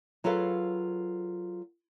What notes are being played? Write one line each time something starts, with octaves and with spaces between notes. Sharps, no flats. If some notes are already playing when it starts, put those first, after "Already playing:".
F#3 F4 G#4 A4 B4 F5